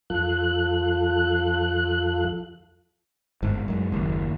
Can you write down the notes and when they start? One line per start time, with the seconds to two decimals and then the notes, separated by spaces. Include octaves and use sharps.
0.10 F2 F3 F4 A4 F#6
3.42 G1 G#2
3.68 F#2 G#3
3.92 F#1 D#2